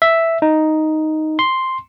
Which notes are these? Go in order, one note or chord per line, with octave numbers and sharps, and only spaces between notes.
E5
D#4
C6